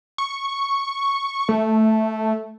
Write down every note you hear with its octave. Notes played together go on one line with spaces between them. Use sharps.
C#6
A3